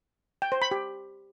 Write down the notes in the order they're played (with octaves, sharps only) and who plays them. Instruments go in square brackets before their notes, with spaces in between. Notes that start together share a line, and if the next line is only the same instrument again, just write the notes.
[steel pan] G5
C5
B5
G4